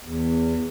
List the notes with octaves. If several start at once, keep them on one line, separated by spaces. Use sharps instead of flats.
E2